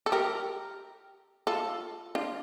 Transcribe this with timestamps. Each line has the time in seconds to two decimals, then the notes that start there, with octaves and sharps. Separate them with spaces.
0.06 A4
0.12 G4 A#4
1.47 F4 A4
2.15 D4 F4